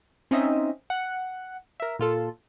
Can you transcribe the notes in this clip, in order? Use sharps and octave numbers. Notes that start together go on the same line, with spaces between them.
C4 C#4 D#4 D#5 E5
F#5
A#4 E5
A#2 F4 A4